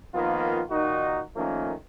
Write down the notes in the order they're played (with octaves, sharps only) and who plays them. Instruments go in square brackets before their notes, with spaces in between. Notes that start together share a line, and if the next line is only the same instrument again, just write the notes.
[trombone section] D#3 F3 A#3 B3 F4
A#2 D#3 D#4 F#4
D#3 F3 A3 A#3 C#4